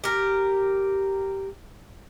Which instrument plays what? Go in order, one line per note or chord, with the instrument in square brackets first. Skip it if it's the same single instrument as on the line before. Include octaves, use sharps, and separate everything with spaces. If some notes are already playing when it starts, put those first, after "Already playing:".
[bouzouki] G4 A#4